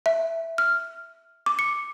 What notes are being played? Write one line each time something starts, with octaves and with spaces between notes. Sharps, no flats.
E5
F6
D6
C#7